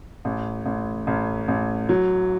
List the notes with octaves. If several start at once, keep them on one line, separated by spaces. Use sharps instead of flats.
A1
A1
A1
A1
F#3